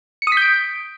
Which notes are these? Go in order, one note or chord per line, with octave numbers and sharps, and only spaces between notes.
C#7
D#6
B6
G6
D7